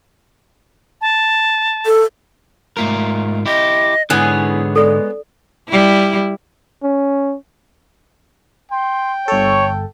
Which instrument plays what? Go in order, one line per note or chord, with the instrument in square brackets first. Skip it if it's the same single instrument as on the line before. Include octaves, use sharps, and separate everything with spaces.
[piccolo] A5
[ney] A4
[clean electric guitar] G#2 F4 A#4 [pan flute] A3
[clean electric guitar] E4 G4 [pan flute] D#5
[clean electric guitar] G#2 D3 [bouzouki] B3 G#4 C#5 [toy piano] D4 [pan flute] E4
[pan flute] G#3 [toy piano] A4 D5
[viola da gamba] G3 E4
[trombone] C#4
[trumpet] G5 [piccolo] C6
[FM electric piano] G1 A4 [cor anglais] C#5 [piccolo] C#6